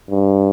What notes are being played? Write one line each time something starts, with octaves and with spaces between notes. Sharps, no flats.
G2